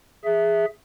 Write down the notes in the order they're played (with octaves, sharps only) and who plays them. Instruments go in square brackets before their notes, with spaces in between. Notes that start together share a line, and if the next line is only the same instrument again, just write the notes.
[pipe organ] G#4 E5